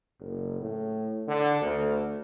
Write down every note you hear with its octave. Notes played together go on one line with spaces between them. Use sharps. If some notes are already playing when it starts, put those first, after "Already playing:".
F#1
A2
D3
D2